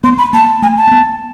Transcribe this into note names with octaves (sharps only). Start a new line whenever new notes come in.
B3 C6
B5
A#3 A5
A3 G#5
A5
A#3
B3